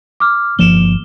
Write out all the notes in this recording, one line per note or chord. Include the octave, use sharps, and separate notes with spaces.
D6 F6
G1 F3 A#3 E7 G7